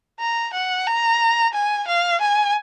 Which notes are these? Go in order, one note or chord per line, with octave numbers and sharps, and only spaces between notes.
A#5
F#5
A#5
G#5
F5
G#5